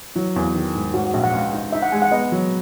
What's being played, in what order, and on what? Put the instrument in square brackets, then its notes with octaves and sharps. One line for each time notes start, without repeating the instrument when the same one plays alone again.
[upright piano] F#3 [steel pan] E4
[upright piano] E2
D#3
G#2
[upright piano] G#2 [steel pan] F#4
[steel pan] F#4
[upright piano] A#1 [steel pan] E5
[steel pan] F#5
[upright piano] C#2
D#4
[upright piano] D#4 [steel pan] E5
[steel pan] F#5
[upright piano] G#3 [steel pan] G#5
[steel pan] F#5
[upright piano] B3 [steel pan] D#5
[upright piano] F#3